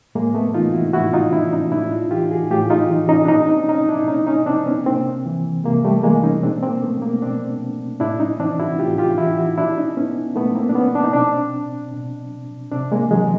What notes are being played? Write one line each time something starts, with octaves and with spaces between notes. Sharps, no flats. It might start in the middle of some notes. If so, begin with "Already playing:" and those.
A2 G#3 A#3
A3 B3
E3 D#4 F4
E4 F#4
A2 E4 F#4
D#4 F4
E3 D4 E4
C#4 D#4
A2 D4 E4
D#4 F4
E3 F4 G4
F#4 G#4
A2 F4 G4
D#4 F4
E3
C#4 D#4
D4
A#2 C#4 D#4
C4 D4
C#4 D#4
D4 E4
A#2 C#4 D#4
C#4 D#4
C4 D4
B3 C#4
C3 A#3 C4
E3
C3 G#3 A#3
G3 A3
E3 G#3 A#3
C#4 D#4
B2 C4 D4
A#3 C4
A3 B3
G#3 A#3
B2 C4 D4
A2 D4 E4
C#4 D#4
E3 C4 D4
E4 F#4
A2 F4 G4
F4 G4
E3 E4 F#4
E4 F#4
A#2 D4 E4
C#4 D#4
B3 C#4
A#2 A3 B3
A#3 C4
D4
B3 C#4
D4
D#4
B2 C4 D4
B2
C3 C4 D4
G#3 A#3
E3 F#3 G#3